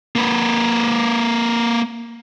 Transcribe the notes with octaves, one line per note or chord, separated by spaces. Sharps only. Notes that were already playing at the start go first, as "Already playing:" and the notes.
A#3 B4